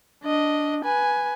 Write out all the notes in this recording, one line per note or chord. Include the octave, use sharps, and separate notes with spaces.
D4 D#5
B4 G#5